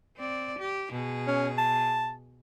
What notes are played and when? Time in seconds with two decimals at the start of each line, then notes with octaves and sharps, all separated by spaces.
0.17 C4 D5
0.58 G4
0.92 B2 G#4
1.28 C#4
1.58 A5